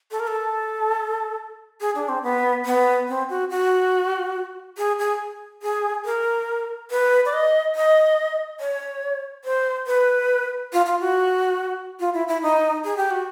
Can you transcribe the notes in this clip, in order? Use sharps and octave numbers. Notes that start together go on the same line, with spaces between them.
A4
A#4
A4
G#4
D4
C4
B3
B3
C4
F#4
F#4
G#4
G#4
G#4
A#4
B4
D5
D#5
D#5
C#5
C5
B4
F4
F4
F#4
F4
E4
E4
D#4
G#4
G4
F#4